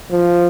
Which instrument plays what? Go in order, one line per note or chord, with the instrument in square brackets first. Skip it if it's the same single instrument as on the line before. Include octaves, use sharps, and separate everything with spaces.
[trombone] F3